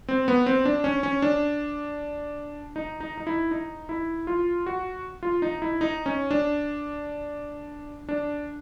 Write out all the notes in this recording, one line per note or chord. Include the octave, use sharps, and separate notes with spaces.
C4
B3
C4
D4
C#4
C#4
D4
D#4
D#4
D#4
E4
D#4
E4
F4
F#4
F4
D#4
E4
D#4
C#4
D4
D4